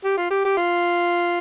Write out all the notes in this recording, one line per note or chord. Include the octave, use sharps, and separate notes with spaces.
G4
F4
G4
G4
F4